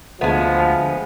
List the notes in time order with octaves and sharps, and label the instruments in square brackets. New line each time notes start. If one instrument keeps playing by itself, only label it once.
[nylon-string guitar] D2 [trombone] F3 [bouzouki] G#3 B3